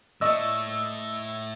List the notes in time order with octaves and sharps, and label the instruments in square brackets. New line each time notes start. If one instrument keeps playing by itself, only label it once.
[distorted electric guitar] A2 A3 [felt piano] D5 D#5 C#6 [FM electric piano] E6